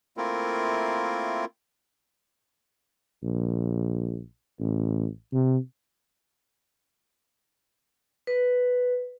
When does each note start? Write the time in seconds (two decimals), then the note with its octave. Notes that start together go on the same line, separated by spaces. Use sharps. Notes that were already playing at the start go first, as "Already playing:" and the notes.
0.17 A3 A#3 C4 E4 F4 A#4
3.23 A#1
4.60 A1
5.33 C3
8.27 B4